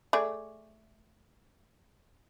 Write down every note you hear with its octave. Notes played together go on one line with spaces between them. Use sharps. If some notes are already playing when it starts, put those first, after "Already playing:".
A3 G#4 D5